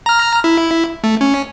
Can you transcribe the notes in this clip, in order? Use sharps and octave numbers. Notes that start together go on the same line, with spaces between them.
A#5 F6
E4
A3
C#4